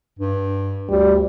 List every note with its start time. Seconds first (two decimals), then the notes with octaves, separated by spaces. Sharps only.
0.19 G2
0.90 D2 G3